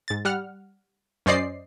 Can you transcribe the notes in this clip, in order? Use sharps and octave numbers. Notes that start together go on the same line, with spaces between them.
G#2 A6
G3 F#5 F6
F#2 C#4 C5 D5 D#5 C7